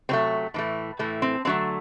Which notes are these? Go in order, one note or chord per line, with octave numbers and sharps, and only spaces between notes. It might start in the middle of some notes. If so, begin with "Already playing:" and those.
C3 F#3 A3 C4
A2 E3 A3
A2 E3 A3
C4
D3 F#3 A3 C4